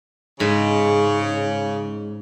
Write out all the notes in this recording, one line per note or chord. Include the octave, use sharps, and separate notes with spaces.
G#2 C#3